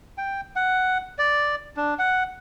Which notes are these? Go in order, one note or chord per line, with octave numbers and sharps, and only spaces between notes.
G5
F#5
D5
D4
F#5